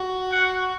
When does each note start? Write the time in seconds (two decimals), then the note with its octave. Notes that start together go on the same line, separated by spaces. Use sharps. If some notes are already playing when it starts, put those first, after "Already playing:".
Already playing: F#4
0.32 F#5